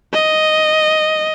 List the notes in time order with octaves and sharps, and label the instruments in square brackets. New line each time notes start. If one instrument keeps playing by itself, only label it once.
[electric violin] D#5